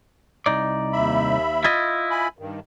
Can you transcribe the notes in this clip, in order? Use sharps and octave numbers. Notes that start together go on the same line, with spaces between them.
C2 D#4 D5
D#2 E5 B5
E4 F4 D#5
G#5 B5
G2 D#3